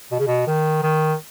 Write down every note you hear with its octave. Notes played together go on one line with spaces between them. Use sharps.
B2
C#3
B2
D#3
D#3